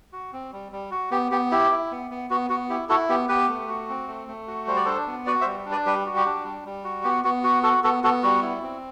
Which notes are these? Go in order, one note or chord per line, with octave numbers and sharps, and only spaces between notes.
F#4
C4
G3
G3
F#4
B3 G4
B3 G4
E4 G4
E4
B3
B3
B3 F#4
B3 F#4
E4 G4
E4 F#4 A4
B3 G4
B3 G4 B4
A3
F#4
C4
A3
A3
F#4
G3 C5
D5
D4 A4 C5
B3
F#4 B4 D5
C5 E5
G3
D4
B4 D5
G3 G4 B4
F#4
G4
D4
G3
G3
F#4
B3 G4
B3 F#4
F#4
F#4 A4
B3 F#4 A4
B3 F#4 A4
G3 F#4
E4
C4